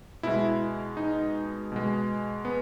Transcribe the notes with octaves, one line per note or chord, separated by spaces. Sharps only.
B2 G#3 E4
D#4
B2 G#3
B3